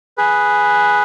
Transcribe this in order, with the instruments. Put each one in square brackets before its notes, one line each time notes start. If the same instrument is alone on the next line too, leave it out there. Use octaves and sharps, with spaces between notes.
[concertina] G#4 B4